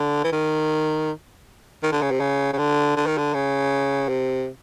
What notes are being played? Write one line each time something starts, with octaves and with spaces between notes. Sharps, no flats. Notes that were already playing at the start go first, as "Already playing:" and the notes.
Already playing: D3
E3
D#3
D#3
D3
C#3
C3
C#3
C#3
D3
D3
D#3
D3
C#3
C3